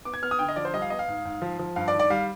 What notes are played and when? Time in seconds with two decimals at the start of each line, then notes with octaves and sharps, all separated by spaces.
0.05 B3 D6
0.14 G#6
0.22 B3 F6
0.31 D#6
0.39 D3 G5
0.49 D#5
0.56 F3 D5
0.65 C5
0.74 G3 D#5
0.82 F5
0.90 B3 D#5
0.99 F5
1.08 G#2
1.25 G#2
1.42 F3
1.59 F3
1.76 G2 F5
1.88 D5
1.93 D#3
1.99 D5
2.10 G3 F5